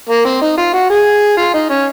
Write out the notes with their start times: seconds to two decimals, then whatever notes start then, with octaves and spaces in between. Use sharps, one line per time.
0.09 A#3
0.25 C4
0.42 D#4
0.58 F4
0.74 F#4
0.90 G#4
1.37 F4
1.54 D#4
1.70 C#4